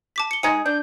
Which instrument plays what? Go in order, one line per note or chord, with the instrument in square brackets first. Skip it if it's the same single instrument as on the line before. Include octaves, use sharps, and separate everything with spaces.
[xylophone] A5 D6 B6
C#7 G7
[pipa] G#3 D#4 G#4 [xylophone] C#7
[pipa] D4 [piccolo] G6